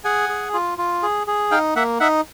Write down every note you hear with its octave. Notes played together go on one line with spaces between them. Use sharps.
G#4 F#5 G#5
G#4
F4
F4
G#4
G#4
D#4 F5 G5
A#3 E5 F#5
D#4 E5 F#5